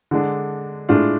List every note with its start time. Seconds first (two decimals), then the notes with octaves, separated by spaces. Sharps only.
0.11 D3 G#3 D4
0.89 A2 G#3 D4 F4